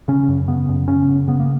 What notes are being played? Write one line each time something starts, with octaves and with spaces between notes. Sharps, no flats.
C#3 C#4
F#2
C#3 B3
F#2
C#3 C#4
F#2
C#3 B3
A#3